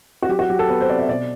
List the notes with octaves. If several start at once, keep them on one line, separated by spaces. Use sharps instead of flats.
F#4
F#3 G4
F#4
F#3 G4
A4
B3 B4
C5
C3 D5
E5
B2 D5